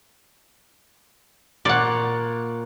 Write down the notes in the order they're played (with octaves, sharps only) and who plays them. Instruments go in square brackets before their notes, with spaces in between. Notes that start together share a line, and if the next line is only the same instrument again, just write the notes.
[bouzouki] A#2 C#5 [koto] D5 F#5